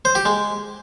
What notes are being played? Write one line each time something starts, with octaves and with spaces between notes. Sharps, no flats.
C5
G4
G#3